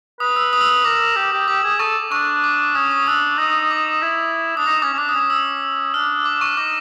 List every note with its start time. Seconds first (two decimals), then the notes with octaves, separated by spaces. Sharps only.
0.20 B4 D#6
0.36 E6
0.53 D#6
0.61 E6
0.69 D#6
0.84 A#4 D6
1.16 G4
1.32 G4
1.48 G4 D6
1.64 G#4
1.80 A4 C#6
2.11 D4 C#6
2.44 D6
2.75 C#4 D#6
2.91 D#6
3.07 D4 E6
3.38 D#4 D#6
3.71 D6
4.03 E4
4.57 D4 D#6
4.66 D#4 D6
4.82 C#4 D6
4.93 C#4
4.98 D4 D6
5.09 D#6
5.14 C#4
5.19 D#6
5.30 E6
5.94 D4 F6
6.25 D6
6.41 C#6
6.57 D#4 D6